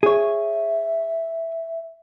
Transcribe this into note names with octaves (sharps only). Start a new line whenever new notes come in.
G#4 C#5 E5